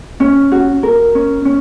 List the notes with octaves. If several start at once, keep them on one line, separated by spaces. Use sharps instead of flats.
C#4
F#4
A#4
C#4
C#4